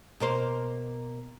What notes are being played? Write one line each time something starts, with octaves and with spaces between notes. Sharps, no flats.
B2 A#3 C5